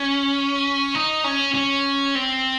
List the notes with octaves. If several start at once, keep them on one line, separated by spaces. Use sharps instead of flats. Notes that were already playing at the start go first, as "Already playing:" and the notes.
Already playing: C#4
D#4
C#4
C#4
C4